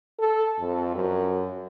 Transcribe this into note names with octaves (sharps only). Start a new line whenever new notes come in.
A4
F2
F#2